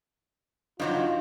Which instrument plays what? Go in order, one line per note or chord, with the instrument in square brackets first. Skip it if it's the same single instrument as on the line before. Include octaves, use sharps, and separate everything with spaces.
[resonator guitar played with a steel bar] G2 F3 F#3 [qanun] D#4 C5 A#5 [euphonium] F4